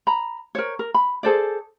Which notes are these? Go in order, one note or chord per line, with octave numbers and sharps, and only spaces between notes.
A#5 B5
A#4 C5 C#5
A#4
B5
G#4 A4 C5 D5